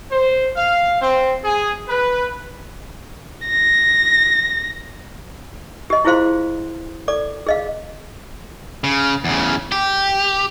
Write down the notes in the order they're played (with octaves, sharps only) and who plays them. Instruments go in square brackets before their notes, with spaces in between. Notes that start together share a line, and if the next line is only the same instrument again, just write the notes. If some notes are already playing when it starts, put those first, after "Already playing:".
[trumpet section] C5
F5
C4
G#4
B4
[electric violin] A#6
[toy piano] G4 D#5
E4 F4 G#4 C5 F5 C6
A4 D5 D6
G#4 D#5 F5
[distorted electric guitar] C#3
E2 C#3
G4